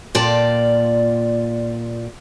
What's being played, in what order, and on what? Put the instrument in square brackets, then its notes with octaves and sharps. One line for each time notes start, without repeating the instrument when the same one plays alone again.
[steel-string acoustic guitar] A#2 F4 D5 G5 A5